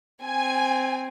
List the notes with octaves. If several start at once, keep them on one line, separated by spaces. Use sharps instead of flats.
C4 G#5